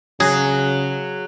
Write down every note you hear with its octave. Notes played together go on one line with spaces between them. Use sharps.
C#3 F#3 G#4